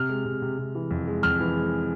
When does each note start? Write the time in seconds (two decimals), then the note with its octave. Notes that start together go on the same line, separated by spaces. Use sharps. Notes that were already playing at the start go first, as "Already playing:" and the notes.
Already playing: C3 F6
0.09 G#3
0.25 C3
0.42 C3
0.58 C3
0.75 E3
0.91 F2
1.07 G#3
1.23 F2 F6
1.40 E3
1.56 G#3